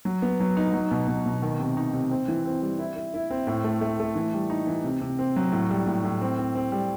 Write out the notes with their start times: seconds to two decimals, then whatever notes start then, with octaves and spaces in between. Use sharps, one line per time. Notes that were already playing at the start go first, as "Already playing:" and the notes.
0.05 F#3
0.22 B3
0.40 F#3
0.57 D#4
0.74 F#3
0.91 B2
1.08 B2
1.26 B2
1.42 D#3
1.60 C3
1.77 D#4
1.93 C3
2.11 C4
2.28 E3
2.46 C4
2.62 G3
2.79 E4
2.96 E4
3.14 E4
3.31 C4
3.47 A2
3.64 A3
3.81 A3
4.00 A3
4.16 E3
4.34 G3
4.50 D#4
4.67 E3
4.84 C3
5.01 C3
5.19 C4
5.36 F#3
5.52 A2
5.70 G3
5.86 A2
6.04 A2
6.22 C4
6.39 C4
6.55 C4
6.72 G3